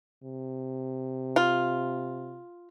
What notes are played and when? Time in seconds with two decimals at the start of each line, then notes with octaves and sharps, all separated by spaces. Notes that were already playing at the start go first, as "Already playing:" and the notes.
0.24 C3
1.36 F4